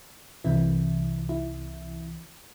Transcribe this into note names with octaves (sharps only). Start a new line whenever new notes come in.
C2 C3 E3 E4
E4